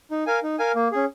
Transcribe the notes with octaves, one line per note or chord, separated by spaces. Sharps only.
D#4
A#4 F5 G#5
D#4
A#4 F5 G#5
A#3
C#4 G#4